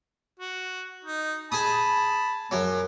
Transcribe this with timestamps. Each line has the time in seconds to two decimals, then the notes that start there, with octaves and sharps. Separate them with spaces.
0.40 F#4
1.05 D#4
1.52 G#4 A5 B5 D#6
2.51 F#2 F#3